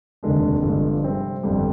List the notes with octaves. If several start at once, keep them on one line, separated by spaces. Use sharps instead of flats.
F1 D#2 D3 G#3 D4
G1 G2 D3 F3 G#3
C3 G3 C4
G1 F2 D3 G3